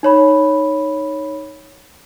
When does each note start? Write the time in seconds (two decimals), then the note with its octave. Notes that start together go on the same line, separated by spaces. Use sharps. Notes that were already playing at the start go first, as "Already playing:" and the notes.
0.03 D#4 C#5 B5